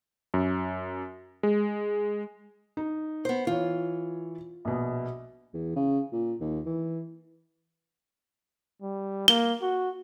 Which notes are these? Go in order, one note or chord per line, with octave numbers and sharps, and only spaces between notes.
F#2
G#3
D#4
B3 C5
E3 F4 C#5
A#1 B2
E2
C#3
A#2
D#2
E3
G3
A#3 G7
F#4